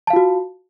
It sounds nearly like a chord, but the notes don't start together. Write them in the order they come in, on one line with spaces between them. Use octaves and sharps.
A5 F5 F4 F#4